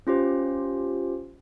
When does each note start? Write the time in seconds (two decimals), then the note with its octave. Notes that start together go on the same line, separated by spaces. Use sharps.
0.07 C#4 F4 G4 C5